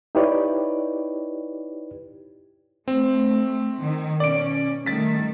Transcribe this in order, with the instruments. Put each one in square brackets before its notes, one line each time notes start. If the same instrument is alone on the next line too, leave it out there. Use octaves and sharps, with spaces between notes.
[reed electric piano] D#4 E4 G4 B4 C#5 D5
[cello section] A3 [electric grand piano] C4
[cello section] D#3
[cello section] B2 C#4 [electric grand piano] D5 D7
[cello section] D#3 G3 A3 [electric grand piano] A6 B6